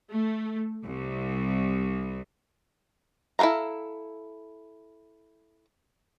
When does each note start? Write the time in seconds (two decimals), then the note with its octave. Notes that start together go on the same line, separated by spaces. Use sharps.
0.11 A3
0.84 C2
3.39 E4 A4 A#4 F5 A#5